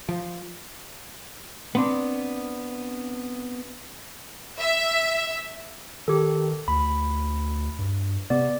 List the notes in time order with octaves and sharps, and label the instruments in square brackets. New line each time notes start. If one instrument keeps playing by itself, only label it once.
[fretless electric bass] F3
[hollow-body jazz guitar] B3 C4 D4
[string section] E5
[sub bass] D#3 [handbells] G4 A4
[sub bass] D2 [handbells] B5
[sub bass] G2
[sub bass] C3 [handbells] B3 D5